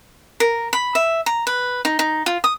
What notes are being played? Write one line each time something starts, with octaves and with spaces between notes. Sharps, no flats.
A#4
B5
E5
A#5
B4
D#4
D#4
F4
D#6